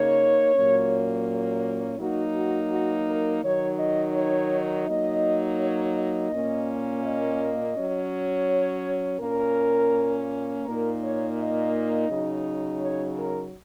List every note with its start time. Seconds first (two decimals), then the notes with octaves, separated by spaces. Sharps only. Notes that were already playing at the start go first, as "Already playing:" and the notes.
Already playing: C#3 A#3 D#4 C#5
0.55 A#2 F#3 A#3 C#4
1.99 F#3 A#3 D#4 F#4
2.36 F#4
2.71 F#4
3.07 A#4
3.44 D#3 F#3 D#4 C#5
3.79 D#5
4.16 C#5
4.88 F#3 A#3 D#4 D#5
5.60 C#5
5.96 D#5
6.33 A#2 A#3 C#4
7.04 D#5
7.77 F#3 C#4
8.50 C#5
9.21 A#2 A#3 C#4 A#4
10.65 A#2 A#3 D#4 A#4
11.02 C#5
11.38 D#5
12.10 C#3 F#3 D#4
12.82 C#5
13.18 A#4